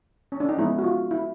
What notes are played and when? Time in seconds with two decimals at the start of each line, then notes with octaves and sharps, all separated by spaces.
0.32 C#4
0.40 D4
0.49 D#4
0.57 F3 G#3 B3 E4
0.79 F#4
0.84 F4
1.11 E4